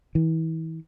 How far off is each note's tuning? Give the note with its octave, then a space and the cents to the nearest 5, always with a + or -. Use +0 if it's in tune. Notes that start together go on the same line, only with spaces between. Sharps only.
E3 -35